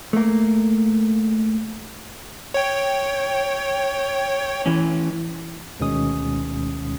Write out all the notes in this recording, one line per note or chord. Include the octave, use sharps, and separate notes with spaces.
A3 A#3
C#5 G5
E3 C#4
D2 B2 D#3 G#3 C#4 D#6